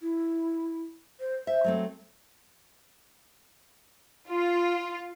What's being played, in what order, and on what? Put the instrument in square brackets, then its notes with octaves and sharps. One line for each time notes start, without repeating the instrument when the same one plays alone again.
[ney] E4
C5
[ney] C5 [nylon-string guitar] E5
[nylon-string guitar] F#3 A3 C4
[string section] F4